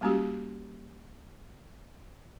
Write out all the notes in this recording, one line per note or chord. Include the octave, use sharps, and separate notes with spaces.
G3 G#3 A#3 C#4 F#4 G4